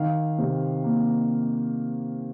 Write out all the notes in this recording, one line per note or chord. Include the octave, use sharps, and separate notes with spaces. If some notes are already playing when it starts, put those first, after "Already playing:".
Already playing: D#3 F5
C3
A#3